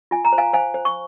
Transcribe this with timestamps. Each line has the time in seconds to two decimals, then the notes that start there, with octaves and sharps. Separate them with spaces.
0.11 F4 G#5
0.25 A#5
0.32 C5
0.38 F5 G#5
0.53 C5 F5 G#5
0.74 C5
0.85 C#6